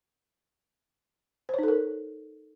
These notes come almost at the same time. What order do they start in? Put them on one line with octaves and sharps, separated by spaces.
C5 C#5 D#4 A4 A#4